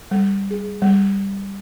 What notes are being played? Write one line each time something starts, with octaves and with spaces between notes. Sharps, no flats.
G3
G#4
G3